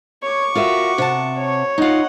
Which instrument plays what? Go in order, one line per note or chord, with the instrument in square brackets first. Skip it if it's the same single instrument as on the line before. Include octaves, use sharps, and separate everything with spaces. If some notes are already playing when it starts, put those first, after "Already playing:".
[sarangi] C#5 [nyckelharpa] C#6 D6
[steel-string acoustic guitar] F4 A#4 E5 [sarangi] F#4
[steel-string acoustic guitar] C3 F#5 A5
[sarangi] C#5
[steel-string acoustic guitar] D#4 F4 [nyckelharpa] D#5 F#5